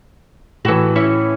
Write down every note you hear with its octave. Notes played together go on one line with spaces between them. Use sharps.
A2 E3 F#4 A4
C#4 E4 C#5